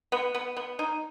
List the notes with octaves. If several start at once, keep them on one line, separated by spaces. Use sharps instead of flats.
B3
B3
B3
D#4